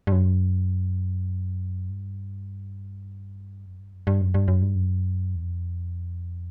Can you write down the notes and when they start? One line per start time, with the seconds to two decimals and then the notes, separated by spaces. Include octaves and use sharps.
0.07 G2
0.12 F#2
1.90 G2
3.66 F#2
3.80 G2
3.93 F#2
4.07 G2
4.21 F#2
4.34 G2
4.48 F#2
4.62 G2
4.75 F#2
5.36 E2
5.42 F2